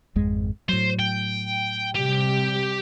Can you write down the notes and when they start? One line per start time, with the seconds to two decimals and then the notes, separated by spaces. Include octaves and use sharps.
0.16 G#1 F2 G#3
0.69 A2 F#3 C5
0.99 G5
1.95 C3 G3 G4